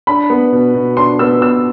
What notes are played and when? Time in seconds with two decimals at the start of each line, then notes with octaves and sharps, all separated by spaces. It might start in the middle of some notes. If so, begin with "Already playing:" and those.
0.07 D4 B5
0.30 B3
0.52 B2
0.74 B2
0.97 D4 C6
1.19 B3 E6
1.41 B2 E6